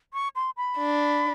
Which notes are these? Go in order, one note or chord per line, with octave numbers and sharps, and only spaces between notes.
C#6
C6
B5
D4